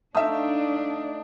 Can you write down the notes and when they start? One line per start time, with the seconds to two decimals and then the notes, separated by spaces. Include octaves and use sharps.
0.15 A3 D4 D#4 E5 F5 D#6